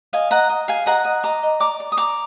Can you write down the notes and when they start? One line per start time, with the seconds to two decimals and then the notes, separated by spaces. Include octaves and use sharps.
0.13 D#5 F5 G#5
0.31 D#5 F#5 A#5
0.49 D#5
0.68 G#4 F5 G#5
0.86 D#5 F#5 A#5
1.05 D#5
1.23 D#5 A#5 D6
1.43 D#5
1.60 D5 A#5 D6
1.80 D5
1.92 D#6
1.97 D5 A#5 D6